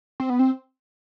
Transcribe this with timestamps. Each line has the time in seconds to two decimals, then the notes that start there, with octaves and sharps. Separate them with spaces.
0.20 C4
0.30 B3
0.39 C4